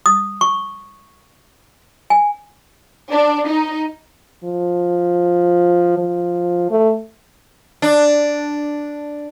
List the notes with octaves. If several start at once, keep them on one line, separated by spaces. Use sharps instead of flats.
D#6
C#6
G#5
D4
D#4
F3
F3
A3
D4